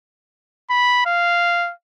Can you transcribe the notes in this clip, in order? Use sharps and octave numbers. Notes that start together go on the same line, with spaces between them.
B5
F5